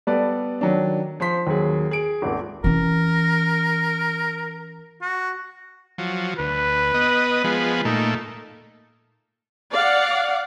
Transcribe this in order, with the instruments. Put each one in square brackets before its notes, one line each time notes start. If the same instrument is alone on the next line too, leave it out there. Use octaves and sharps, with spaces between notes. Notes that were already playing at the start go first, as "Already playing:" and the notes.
[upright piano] G3 B3 A4 B4 D5
D#3 F#3 D4
F3 C5 C6 B6
D#2 F#3 G#4
G#4 D7
D#1 G#1
[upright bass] E3 C#4 [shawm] A#4
[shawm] F#4
[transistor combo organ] F3 F#3
[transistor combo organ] D2 [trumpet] B4
[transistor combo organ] B3 D#5
F3 G#3 B3
[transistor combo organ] A#2 A3 [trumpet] D#4
[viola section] D5 F5 F#5